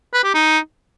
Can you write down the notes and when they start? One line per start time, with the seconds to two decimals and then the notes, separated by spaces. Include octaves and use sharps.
0.14 B4
0.24 G4
0.34 D#4